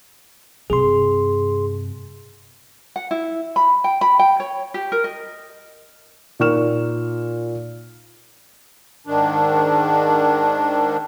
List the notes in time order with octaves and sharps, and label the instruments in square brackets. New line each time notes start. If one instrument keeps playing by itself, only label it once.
[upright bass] G2 C3 [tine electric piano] G#4 C6
[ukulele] F#5
E4
B5
G5
B5
G5
C#5
G4
A#4
D#5
[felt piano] A#2 D#4 A#4 C#6 F6 E7
[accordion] G#2 D#3 D4